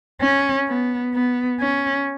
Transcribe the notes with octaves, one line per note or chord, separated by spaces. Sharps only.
C#4
B3
B3
C#4